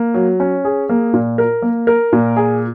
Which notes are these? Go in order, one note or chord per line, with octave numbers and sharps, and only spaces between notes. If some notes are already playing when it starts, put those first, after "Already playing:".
Already playing: A#3
F#3
C#4
G#4
A#3
A#2
A#4
A#3
A#4
A#2
G#4